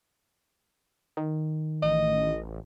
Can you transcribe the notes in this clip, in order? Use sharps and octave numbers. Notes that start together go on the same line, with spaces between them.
D#3
A1 D#5